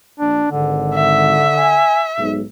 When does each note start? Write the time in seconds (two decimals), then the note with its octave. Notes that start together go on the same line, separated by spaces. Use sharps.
0.20 A#1 D4
0.52 G#1 D3
0.95 E5
1.58 G#5
2.18 B1 G#2